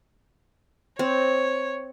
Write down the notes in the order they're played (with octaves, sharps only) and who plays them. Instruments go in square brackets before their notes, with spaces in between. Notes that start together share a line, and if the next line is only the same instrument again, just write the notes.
[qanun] C4 [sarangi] C#5